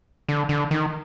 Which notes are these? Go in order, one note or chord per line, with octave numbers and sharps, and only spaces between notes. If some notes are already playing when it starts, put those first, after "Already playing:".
D3
D3
D#3